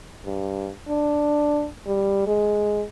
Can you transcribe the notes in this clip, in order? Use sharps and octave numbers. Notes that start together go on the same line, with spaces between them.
G2
D4
G3
G#3